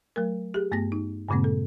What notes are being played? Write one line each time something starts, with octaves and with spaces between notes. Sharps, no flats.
F#3 A3 A#4
G4 G#4
G2 A3 B3 A#6
D#4
G2 A#2 C#3 G#3 A#3 C4
A4